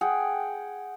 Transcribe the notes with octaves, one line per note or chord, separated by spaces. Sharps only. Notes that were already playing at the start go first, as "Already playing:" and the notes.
G#4 F#5 G5